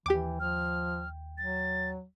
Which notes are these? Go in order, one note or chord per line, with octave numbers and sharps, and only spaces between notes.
D#2 E3 G4 G5 D6
F3 F6
F#3 A6